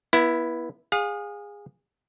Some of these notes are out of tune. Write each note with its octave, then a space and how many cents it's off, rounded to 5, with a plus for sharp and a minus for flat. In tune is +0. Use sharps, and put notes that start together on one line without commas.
B3 -25 E4 +0
G#4 -20 F5 +35